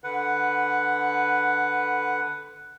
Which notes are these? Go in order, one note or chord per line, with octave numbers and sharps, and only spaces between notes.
D3 B4 F#5